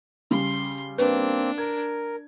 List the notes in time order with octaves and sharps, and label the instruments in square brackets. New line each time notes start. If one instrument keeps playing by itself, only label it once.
[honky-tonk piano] C#3 G3 [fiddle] C6
[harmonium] A#3 C4 [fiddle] D4 [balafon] B4
[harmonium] A#4 [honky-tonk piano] G#6